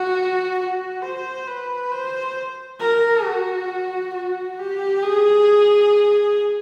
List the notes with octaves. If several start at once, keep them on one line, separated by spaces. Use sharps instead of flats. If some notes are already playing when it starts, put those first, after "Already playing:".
Already playing: F#4
F#4
C5
B4
C5
A#4
F#4
F#4
G4
G#4